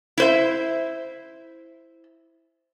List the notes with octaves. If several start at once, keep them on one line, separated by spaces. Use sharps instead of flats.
E4 C5 E5